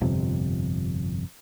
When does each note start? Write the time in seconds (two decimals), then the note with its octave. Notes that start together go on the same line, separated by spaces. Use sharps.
0.01 G1 F2 C3